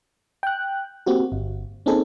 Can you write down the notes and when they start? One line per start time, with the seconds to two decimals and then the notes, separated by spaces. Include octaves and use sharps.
0.43 G5 F#6
1.06 A#3 C4 F#4 G4
1.32 G1
1.86 A#3 C4 C#4 D#4 G#4 A4